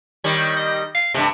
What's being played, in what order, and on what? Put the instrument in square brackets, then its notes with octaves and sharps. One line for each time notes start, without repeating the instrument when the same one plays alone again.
[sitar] D#3 G3 [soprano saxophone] C#5
[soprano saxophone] D#5
F5
[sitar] G2 C3 [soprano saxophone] A3